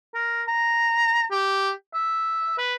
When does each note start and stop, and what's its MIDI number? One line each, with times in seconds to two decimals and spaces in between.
0.15 0.43 70
0.48 1.24 82
1.31 1.71 67
1.94 2.54 76
2.58 2.74 71